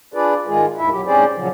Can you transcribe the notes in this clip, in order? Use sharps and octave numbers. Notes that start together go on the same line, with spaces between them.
D4 F4 G#4 B4 D5
G#2 D#3 G#3 F4 G#4
D#2 G#2 E4 E5
B2 F#3 G4
G#2 C4 C#4 G#4 C5 D5
A#2 C#3 F3 F#3